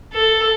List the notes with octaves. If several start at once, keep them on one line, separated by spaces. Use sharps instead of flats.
A4